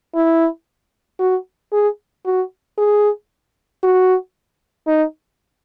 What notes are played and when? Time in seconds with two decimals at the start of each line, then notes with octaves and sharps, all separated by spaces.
0.15 E4
1.20 F#4
1.73 G#4
2.26 F#4
2.78 G#4
3.83 F#4
4.87 D#4